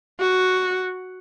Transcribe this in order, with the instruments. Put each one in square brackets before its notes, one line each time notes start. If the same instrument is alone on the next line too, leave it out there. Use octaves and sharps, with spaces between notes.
[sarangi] F#4